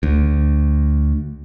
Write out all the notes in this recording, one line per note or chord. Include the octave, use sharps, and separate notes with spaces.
D2